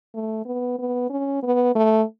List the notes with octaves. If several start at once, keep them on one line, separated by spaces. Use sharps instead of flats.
A3
B3
B3
C#4
B3
A3